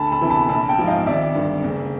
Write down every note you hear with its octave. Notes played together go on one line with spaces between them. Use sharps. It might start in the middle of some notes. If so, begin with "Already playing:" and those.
Already playing: D2 A5 B5
A5 B5
C3 E3
A5 B5
A#1 A5 B5
G5 A5
G#2 F3
D#5 F5
G#1 D5 E5
G2 D3
F#1